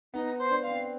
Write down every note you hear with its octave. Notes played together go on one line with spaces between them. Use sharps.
B3 D#4
C5
D4
F5
C4